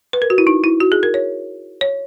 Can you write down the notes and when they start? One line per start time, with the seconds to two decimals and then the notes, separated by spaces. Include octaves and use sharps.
0.13 B4
0.22 A#4
0.30 F#4
0.38 E4
0.47 D#4
0.64 E4
0.80 F#4
0.92 G#4
1.03 A#4
1.14 C#5
1.81 C#5